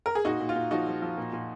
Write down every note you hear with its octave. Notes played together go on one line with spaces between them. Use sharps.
A#4
G#4
A#2 D#4 F#4
A#2
F4
A#2
F3 D#4 F#4
F3
F3
A#2
A#2